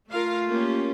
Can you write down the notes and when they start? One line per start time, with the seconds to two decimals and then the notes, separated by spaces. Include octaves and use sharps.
0.10 A3 F4 A#4 F5
0.49 A#3 C#4 G4